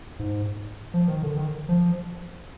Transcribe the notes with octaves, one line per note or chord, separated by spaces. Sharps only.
G#2
F3
D#3
D3
D#3
F3